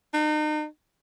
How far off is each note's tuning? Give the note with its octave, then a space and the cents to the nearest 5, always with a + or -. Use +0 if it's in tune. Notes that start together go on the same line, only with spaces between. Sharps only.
D#4 -35